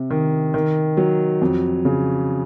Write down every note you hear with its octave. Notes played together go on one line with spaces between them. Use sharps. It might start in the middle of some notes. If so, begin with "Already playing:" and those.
Already playing: C3
D#3
D#3
F#3
F2
C#3